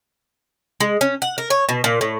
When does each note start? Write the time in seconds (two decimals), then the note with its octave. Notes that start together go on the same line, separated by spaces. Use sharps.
0.80 G#3
1.01 C#4
1.22 F#5
1.38 A#4
1.50 C#5
1.69 B2
1.84 A#2
2.01 A2